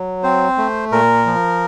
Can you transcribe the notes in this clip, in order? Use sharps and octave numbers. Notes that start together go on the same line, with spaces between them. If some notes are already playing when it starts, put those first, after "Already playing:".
Already playing: F#3
C4 C5
A3
A#2 A#4
F3